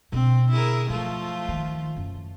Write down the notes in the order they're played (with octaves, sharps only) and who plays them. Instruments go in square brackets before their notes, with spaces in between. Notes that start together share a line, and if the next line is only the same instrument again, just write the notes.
[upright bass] B2 D3 [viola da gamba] C4
[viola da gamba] E4 G#4 A#4
[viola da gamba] F3 A3 F4 [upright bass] F#3
[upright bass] D#3
F#2